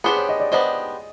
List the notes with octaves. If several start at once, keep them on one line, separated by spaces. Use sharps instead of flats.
B3 D4 G4 G#4 C5
C#5
D#5
D5
B3 D4 G4 C5 D#5